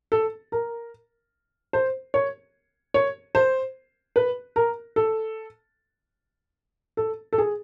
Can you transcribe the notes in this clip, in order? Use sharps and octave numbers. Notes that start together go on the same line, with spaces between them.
A4
A#4
C5
C#5
C#5
C5
B4
A#4
A4
A4
A4
G#4